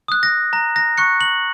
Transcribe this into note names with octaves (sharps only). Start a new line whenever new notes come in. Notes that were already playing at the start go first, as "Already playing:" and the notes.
D#6 F#6
A#6
A#5 A#6
A#6
C#6 F#6 C#7
F#7